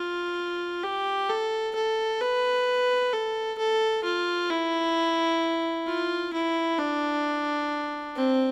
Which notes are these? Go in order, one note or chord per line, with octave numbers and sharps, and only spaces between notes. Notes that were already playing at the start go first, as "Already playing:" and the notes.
Already playing: F4
G4
A4
A4
B4
A4
A4
F4
E4
F4
E4
D4
C4